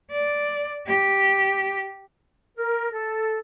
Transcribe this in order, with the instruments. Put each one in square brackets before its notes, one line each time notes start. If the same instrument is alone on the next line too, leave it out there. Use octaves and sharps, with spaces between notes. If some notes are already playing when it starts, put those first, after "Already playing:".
[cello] D5
G4
[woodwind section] A#4
A4